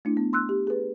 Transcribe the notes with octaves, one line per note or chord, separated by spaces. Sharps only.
A3 D4 E4
B3
C6 E6 F#6
G4
G#4 B4